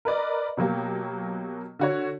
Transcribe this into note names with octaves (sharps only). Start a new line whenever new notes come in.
A#4 B4 D5 D#5
B2 F#3 A#3 G4
D3 F#4 C#5